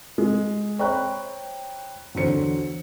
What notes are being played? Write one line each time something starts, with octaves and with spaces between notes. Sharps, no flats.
G#3
C5 C#5 G5 A#5 B5 F#6
E2 D3 F#3 C5 C#7